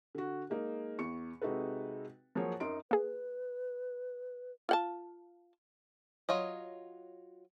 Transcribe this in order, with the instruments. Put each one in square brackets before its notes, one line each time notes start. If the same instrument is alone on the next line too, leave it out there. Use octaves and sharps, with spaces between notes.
[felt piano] D3 F#4
G#3 A#3 D#4
E2 C#6 C#7
C3 G#3 D#4 F#4 A4 B4
F3 F#3 A#3 G#4 C#5
F#2 D#4 A#4 C6 D7
[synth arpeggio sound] A#3 G#4 [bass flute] B4
[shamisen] F4 F#5 A5
[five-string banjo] F#3 F4 C#5 D#5